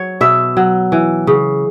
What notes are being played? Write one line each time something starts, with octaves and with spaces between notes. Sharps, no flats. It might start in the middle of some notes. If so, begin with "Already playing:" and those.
Already playing: F#3 C#5
B2 E5
F#3
E3
C#3